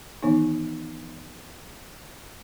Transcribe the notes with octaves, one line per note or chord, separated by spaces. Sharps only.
D#3 E3 B3 D#4